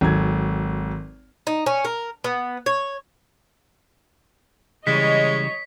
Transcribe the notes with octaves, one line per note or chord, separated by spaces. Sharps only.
G#1 F#3 A4 G#6
D#4
C#4
A#4
B3
C#5
C#3 E3 G3 G#3 C#5 D#5 B6